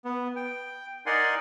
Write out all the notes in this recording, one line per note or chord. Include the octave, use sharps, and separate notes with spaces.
B3
G5
D#4 A#4 D5 F#5 G#5 C6